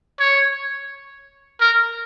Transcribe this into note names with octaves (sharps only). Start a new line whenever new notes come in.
C#5
A#4